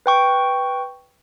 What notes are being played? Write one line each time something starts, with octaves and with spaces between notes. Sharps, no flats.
B4 G5 C#6